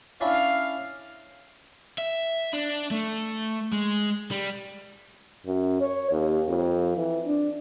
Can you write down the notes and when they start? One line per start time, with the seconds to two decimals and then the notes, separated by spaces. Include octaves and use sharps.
0.21 C#4 D4 E4 F5
1.98 E5
2.53 D4
2.91 A3
3.73 G#3
4.31 G3
5.46 F#2
5.81 C#5
6.11 D#2
6.48 F2
6.97 E3
7.26 D4